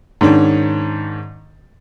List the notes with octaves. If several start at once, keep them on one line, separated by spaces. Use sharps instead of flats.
G#2 D#3 C#4 D4